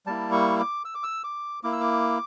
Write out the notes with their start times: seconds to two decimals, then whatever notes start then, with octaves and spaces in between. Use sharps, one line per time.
0.06 G3 A#3 E4 A5
0.32 C#6
0.59 D6
0.85 E6
0.95 D6
1.04 E6
1.24 D6
1.64 A#3 E4 D6
1.73 E6
1.81 D6